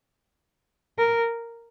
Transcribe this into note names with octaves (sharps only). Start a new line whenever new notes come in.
A#4